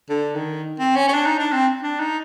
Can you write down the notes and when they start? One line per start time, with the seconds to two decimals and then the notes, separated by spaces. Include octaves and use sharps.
0.10 D3
0.36 D#3
0.80 C4
0.96 C#4
1.08 C#4
1.13 D4
1.26 D#4
1.39 D4
1.52 C4
1.83 D4
2.00 D#4